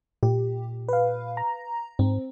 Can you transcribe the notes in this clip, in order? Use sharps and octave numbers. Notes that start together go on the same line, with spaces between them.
A#2 G4
B4 F5
A#5
G#2 C4